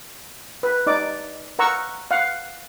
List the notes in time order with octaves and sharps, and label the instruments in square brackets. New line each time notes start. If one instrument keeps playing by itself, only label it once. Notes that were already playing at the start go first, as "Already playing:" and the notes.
[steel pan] B4
D#4 D5 D6
A#4 F#5 A#5 C#6 E6
F5 F#5